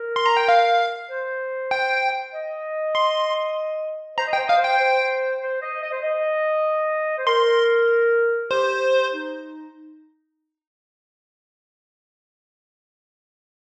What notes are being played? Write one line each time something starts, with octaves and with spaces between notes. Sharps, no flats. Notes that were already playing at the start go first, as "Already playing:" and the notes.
Already playing: A#4
C6
A#5
G5
F5
C5
G5
D#5
C6
C5 A#5
D#5
G5
C5
D#5 F5
C5
G5
C5
C5
D#5
D#5
C5
D#5
C5
A#4 C6
G4 C5
D#4